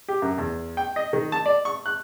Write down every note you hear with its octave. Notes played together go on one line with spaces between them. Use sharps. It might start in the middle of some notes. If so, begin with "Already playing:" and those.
G4
F#2
E2
G5
D#5
D#3
A5
D5
C#6
F#6